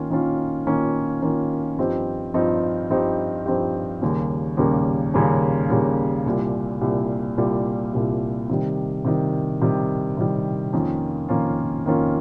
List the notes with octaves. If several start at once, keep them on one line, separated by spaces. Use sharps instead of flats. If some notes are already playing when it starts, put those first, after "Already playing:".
Already playing: D#3 A#3 C#4 F4
D#3 A#3 C#4 F4
D#3 A#3 C#4 F4
D#3 A#3 C#4 F4
G2 F3 C4 D#4 G4
G2 F3 C4 D#4 G4
G2 F3 C4 D#4 G4
G2 F3 C4 D#4 G4
D#2 C#3 G3 A#3 C#4
D#2 C#3 G3 A#3 C#4
D#2 C#3 G3 A#3 C#4
D#2 C#3 G3 A#3 C#4
C2 A#2 G3
C2 A#2 G3
C2 A#2 G3
C2 A#2 G3
C3 D#3 G3
C3 D#3 G3
C3 D#3 G3
C3 D#3 G3
F2 D#3 A#3 C#4 F4
F2 D#3 A#3 C#4 F4
F2 D#3 A#3 C#4 F4